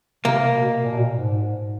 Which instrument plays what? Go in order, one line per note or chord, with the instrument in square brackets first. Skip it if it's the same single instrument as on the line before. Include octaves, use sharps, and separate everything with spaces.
[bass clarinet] C3 [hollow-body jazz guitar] A#3
[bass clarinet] B2
A#2
B2
A#2
G#2